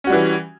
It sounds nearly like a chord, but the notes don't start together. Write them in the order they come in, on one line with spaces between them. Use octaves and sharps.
C#4 F#4 G3 E3